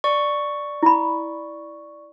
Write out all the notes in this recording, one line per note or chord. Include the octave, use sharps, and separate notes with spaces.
D5 C#6
E4 B5